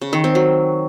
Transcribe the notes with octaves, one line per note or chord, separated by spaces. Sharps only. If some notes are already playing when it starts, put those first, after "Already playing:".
C#3
D#3
C4
F#3